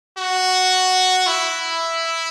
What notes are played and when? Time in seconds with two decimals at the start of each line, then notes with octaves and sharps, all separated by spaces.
0.17 F#4
1.27 E4